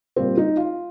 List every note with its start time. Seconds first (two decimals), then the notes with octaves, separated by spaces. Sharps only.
0.16 A#2 G3 A#3 C4
0.37 D#4
0.57 F4